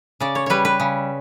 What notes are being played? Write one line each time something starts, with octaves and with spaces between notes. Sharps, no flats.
C#3 D5
C#5
G3 B4 C#5
B4
C#3